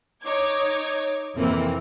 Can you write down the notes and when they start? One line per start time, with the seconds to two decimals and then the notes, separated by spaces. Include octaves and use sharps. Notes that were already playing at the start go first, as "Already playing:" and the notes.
0.23 D#4 C#5 D6 G#6
1.36 F2 C3 E3 A#3 C4